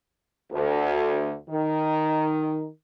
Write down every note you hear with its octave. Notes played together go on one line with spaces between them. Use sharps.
D2
D#3